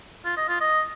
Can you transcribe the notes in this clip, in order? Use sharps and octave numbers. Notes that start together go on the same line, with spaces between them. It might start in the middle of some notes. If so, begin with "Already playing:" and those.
F4
D#5
F4
D#5